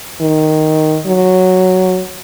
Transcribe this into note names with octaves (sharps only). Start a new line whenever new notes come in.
D#3
F#3